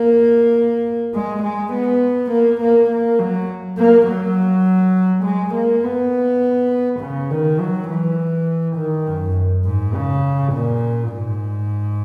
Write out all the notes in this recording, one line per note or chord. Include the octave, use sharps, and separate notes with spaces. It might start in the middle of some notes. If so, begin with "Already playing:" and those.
Already playing: A#3
G#3
G#3
B3
A#3
A#3
A#3
F#3
A#3
F#3
G#3
A#3
B3
C#3
D#3
F#3
E3
D#3
F#2
G#2
C#3
A#2
G#2